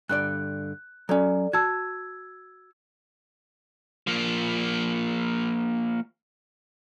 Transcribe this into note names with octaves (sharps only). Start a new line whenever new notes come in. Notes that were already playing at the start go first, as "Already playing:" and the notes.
G2 D3 D5 F#6
F#3 C#4 A4 D5
F#4 A5 E6 G#6
F3 A#3